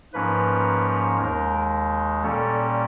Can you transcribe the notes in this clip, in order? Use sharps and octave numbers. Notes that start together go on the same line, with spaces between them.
G#2 F3 A#3 C#4 B4
D#2 D#3 G#3 A#4
A#2 G3 A#3 C#4 A4